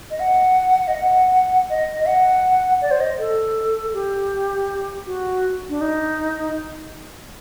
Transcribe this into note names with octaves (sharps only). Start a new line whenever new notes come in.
D#5
F#5
D#5
F#5
D#5
D#5
F#5
D5
C5
D#5
A4
G4
F#4
D4
D#4